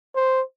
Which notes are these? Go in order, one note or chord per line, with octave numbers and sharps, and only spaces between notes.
C5